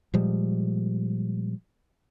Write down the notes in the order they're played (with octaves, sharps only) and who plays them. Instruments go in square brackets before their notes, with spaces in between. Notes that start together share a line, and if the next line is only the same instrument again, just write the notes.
[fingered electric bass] A#2 F3 G3 G#3